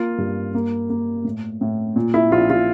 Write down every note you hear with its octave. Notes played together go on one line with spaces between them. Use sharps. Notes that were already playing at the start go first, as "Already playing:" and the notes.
Already playing: A#3 F4
G2
A#3
A#3
A2
A2
A#2
E4
A#1 F4
F4